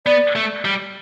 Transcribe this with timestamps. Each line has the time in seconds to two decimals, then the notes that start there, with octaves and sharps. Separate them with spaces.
0.06 B3 D5
0.36 A3
0.65 G3